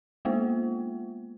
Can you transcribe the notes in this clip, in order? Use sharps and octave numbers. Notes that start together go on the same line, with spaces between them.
G#3 A#3 B3 F4 C5